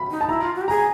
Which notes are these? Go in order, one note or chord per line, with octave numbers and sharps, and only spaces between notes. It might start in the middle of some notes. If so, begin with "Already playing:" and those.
Already playing: B5
D#4
A5
E4 A#5
F4
F#4
G4
G#4 A#5